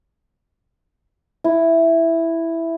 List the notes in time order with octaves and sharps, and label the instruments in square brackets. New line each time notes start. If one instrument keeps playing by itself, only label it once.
[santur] E4